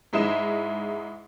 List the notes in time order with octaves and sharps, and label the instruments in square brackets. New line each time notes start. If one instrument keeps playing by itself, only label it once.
[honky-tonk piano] G#2 G#3 D#4 E4 E7